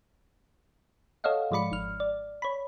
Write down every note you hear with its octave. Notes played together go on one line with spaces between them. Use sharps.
A4 C#5 D#5 F5 F#5
G#2 F3 G#3 D5 B5 C#7
G#1 F6
D5
C#5 B5